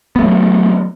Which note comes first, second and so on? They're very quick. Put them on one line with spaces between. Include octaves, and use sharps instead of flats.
B3 A3 F#3